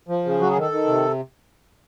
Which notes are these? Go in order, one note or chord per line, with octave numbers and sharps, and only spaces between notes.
F3
C#3
F#3 F#4
G#4
D#3
A4
D#3
C3